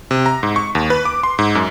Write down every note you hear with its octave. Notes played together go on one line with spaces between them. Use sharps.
C3
A#5
G#2
C#6
D#2
B4
D6
C6
G#2
F#2